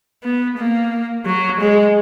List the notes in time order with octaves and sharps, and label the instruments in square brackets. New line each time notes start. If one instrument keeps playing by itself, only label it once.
[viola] B3
A#3
F#3
G#3